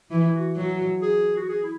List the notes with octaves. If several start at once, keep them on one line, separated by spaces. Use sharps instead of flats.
E3 E4
F#4
F#3 F#4
G#4
F#4
G#4
E4